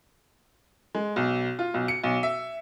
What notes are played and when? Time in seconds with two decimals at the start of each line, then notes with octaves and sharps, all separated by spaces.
0.95 G#3
1.16 B1
1.59 F4
1.74 B1
1.88 C#7
2.04 B1
2.23 E5